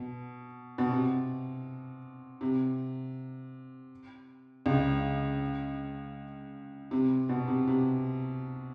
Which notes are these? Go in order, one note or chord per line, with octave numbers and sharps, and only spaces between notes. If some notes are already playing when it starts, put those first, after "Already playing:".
Already playing: B2
B2
C3
C3
C#2 C#3
C3
B2
C3
C3